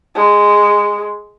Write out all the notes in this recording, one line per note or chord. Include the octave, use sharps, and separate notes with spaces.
G#3